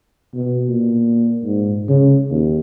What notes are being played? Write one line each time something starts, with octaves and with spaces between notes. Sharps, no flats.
B2
A#2
G#2
C#3
D#2